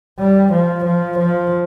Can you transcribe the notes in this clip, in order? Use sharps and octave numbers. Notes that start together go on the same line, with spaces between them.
G3
F3
F3
F3